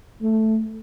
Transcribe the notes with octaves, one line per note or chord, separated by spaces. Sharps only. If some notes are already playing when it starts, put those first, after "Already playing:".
A3